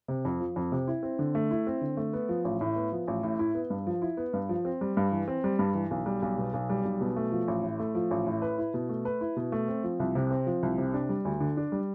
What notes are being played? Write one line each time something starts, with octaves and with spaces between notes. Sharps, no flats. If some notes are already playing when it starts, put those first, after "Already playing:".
C3
F2
F3
F2
C3
E4
C4
D3
A3
E4
C4
D3
A3
B3
F3
A1
A2
B3
F3
A1
A2
E4
B3
G2
F3
E4
B3
G2
F3
C4
G3
G2
E3
C4
G3
G2
E3
B1
G3
B1
B2
B1
G3
B1
B2
A3
F3
A1
A2
A3
F3
A1
A2
B4
E4
B2
A3
B4
E4
B2
A3
C4
F3
C2
C3
C4
F3
C2
C3
D4
G3
D2
D3
D4
G3